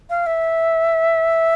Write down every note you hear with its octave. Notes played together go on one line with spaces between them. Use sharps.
F5
E5